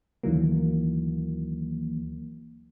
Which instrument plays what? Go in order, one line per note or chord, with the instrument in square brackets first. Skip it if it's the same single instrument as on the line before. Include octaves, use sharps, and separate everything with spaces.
[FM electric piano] D2 D#3 E3 F#3 A#3